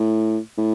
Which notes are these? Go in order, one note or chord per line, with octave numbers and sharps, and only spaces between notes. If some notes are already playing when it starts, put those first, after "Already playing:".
Already playing: A2
A2